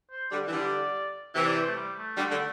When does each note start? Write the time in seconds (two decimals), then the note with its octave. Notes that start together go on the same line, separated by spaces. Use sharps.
0.11 C5
0.31 D3 G3 D5
0.48 E3
0.52 D3 G3 D5
1.35 C3 E3 E5
1.45 D5
1.56 C5
1.66 A3
1.76 G3
1.97 A3
2.17 D3 G3
2.31 D3